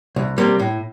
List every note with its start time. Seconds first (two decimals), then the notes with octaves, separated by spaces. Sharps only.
0.16 C2
0.38 C3 G3 A#3
0.59 A2